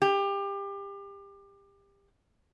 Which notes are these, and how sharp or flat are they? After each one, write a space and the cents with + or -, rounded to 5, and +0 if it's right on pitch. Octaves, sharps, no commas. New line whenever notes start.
G4 +25